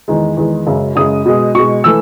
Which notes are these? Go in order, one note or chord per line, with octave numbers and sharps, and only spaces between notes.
E2 D#3 G#3
E2 D#3 G#3
F#2 C#3 G#3
F#2 C#3 G#3 D#6
B2 G#3
B2 G#3 C#6
E3 A3 E6